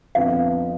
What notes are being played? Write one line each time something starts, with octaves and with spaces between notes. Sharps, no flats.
F2 D3 F3 B3 F5